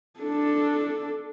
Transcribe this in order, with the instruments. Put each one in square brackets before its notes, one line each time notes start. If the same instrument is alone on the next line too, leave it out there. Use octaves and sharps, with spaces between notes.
[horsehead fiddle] D4 A4